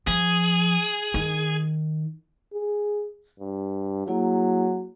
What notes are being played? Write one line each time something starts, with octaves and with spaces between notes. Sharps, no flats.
F3 G#4
D#3
G#4
G2
F#3 A#3 E4 G#4